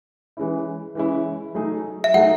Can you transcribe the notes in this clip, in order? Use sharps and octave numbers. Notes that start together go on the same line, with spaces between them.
E3 G#3 C#4 E4
E3 G#3 C#4 E4
F#3 A3 D#4 G#4
E5
F#3 A3 D#4 G#4 F#5